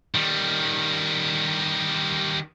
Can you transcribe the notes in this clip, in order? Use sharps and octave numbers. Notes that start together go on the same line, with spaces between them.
D#3 G3